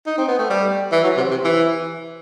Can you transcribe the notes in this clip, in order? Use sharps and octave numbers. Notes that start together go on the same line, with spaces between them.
D#4
C4
B3
A3
G3
E3
F#3
C3
C3
E3